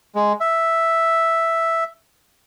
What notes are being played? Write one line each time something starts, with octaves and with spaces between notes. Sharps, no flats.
G#3
E5